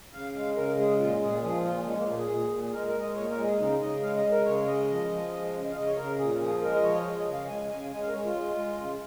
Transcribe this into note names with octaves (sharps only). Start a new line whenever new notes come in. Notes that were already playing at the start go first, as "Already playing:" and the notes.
C#3 F5
G#3 F5
C#3 A#4
G#3 G#4
A#2 F4
A#2 G#4
F3 G#4
A#2 F4
G#3 C#4
A#3
A#2 A#3
G#4
A#2
A#2
G#4
G#3 A#4
A#4
G#3
D#5
A#2 C#5
A#4
G#3
G#4
C#3 D#4
C#3 D#5
G#3 F5
D#5
G#3
A#4
C#3 C#5
G#3 D#5
F3
F3
G#3
C#3
F5
C#3 D#5
C#5
C#3 A#4
A#2 G#4
F3 G#4
G#3 A#4
D#5
F3 C#5
D#5
G#3 C#5
D#5
C#3
F5
G#3 G#5
C#3 G#5
G#3 G#5
F5
A#4
G#3 C#5
F4
G#3
G#3
C#3